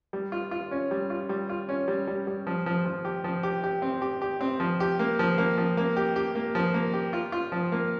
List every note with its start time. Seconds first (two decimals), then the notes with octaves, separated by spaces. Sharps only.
0.13 G3
0.32 F4
0.51 F4
0.71 C#4
0.91 G3
1.10 F4
1.29 G3
1.49 F4
1.69 C#4
1.88 G3
2.07 G3
2.27 G3
2.47 F3
2.66 F3
2.86 F3
3.05 G4
3.24 F3
3.43 G4
3.64 G4
3.82 C4
4.02 G4
4.22 G4
4.41 C4
4.60 F3
4.80 G4
4.99 A#3
5.19 F3
5.38 A#3
5.58 F3
5.77 A#3
5.96 G4
6.16 G4
6.35 A#3
6.55 F3
6.74 A#3
6.93 G4
7.13 F4
7.32 F4
7.52 F3
7.72 A#3